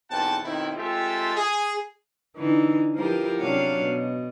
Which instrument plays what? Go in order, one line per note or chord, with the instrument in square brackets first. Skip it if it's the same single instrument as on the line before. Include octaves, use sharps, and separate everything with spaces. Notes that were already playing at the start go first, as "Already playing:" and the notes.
[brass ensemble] B1 E2 C4 F#5 G5 A5
B1 D#3 C4 E4
G#3 C4 F4 G4 A4 E5
G#4
[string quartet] D3 E3 D#4
F3 E4 G4 A#4 B4
C3 F#3 C#4 D4 F5 F#5
B2